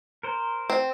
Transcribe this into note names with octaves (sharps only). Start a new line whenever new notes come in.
A#4 C5
C4